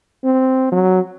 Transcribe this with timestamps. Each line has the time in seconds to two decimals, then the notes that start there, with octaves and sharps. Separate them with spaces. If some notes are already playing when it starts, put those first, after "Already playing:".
0.24 C4
0.72 F#3